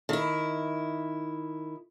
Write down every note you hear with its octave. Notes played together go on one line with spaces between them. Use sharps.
D#3 E4